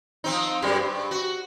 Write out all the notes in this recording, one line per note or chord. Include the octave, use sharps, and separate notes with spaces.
F3 C4 D#4
F#2 G3 G#3
G2
F#4